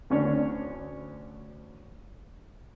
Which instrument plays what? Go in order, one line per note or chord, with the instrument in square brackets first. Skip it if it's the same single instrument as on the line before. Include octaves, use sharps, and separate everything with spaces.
[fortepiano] D2 D3 C#4 D4 C#5